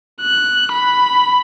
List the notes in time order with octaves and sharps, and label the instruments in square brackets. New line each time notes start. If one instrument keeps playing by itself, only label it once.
[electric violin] F#6
B5